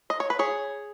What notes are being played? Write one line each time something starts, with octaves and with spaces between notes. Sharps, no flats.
D#5
C#5
B4
G#4 C#5